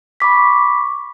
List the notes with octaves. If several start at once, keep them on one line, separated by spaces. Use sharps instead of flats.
B5 C#6 D6 B6